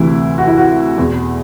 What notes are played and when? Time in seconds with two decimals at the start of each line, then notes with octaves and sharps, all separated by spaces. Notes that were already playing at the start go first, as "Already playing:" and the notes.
Already playing: D2 C3 E3 E4
0.38 F#4
0.47 E4
0.58 F#4
0.98 E2 B2